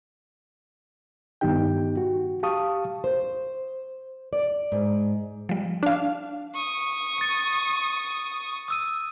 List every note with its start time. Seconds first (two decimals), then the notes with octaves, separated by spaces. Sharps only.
1.41 G2 D#3 B3 D#4 G4 G5
1.97 F#4
2.43 G4 F5 A5 C#6 D#6
3.04 C5
4.33 D5
4.72 G#2
5.49 F3 G3
5.83 D4 F5
6.55 C#6 D#6
7.18 A6 C#7
8.68 D#6 E6 D#7